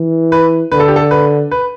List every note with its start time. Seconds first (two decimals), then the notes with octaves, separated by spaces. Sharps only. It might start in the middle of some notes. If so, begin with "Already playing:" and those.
Already playing: E3
0.32 B4
0.72 D3 B4
0.80 A4
0.88 G4
0.96 A4
1.11 B4
1.51 B4